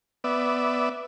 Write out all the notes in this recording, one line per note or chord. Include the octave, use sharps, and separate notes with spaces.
B3 D5 E5